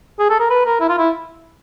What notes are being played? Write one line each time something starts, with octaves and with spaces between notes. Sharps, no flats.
G#4
A4
A#4
B4
A#4
E4
F4
E4